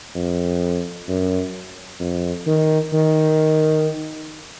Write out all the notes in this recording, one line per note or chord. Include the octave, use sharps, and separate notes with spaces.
F2
F#2
F2
D#3
D#3